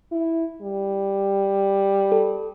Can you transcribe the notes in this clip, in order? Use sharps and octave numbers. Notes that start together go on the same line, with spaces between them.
E4
G3
A4